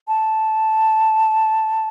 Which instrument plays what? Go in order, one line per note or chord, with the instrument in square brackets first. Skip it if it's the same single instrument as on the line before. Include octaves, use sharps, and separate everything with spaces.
[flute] A5